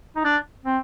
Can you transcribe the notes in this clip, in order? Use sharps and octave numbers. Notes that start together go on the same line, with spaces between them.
D#4
D4
C4